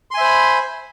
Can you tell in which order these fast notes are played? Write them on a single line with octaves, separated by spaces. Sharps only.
C6 G#5 E5 C5 B5